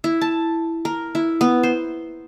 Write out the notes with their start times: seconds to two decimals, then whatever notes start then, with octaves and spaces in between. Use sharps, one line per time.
0.04 E4
0.21 A5
0.85 A#4
1.15 E4
1.41 B3
1.63 C5